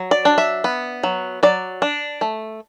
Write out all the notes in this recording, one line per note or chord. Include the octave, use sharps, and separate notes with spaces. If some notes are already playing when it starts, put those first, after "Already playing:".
Already playing: F#3
D5
D4
E5
B3
F#3
F#3 D5
D4
A3